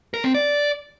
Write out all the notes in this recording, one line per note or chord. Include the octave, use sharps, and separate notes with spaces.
A#4
C4
D5